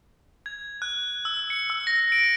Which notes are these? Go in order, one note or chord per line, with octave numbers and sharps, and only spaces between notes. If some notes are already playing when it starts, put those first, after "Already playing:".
G#6
F#6
E6
C#7
E6
A#6
D7